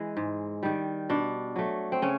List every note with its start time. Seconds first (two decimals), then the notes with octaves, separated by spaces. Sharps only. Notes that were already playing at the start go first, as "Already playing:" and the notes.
Already playing: E3 G#3
0.17 G#2
0.63 D#3 G3
1.09 B2 D4
1.56 F#3 A3
1.92 C4
2.02 C#3 C#4